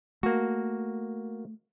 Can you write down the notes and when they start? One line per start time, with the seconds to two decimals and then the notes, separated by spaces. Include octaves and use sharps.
0.23 A3 A#3 F#4